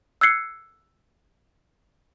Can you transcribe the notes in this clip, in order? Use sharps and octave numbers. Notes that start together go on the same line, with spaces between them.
E6 F#6 G#6 C7 C#7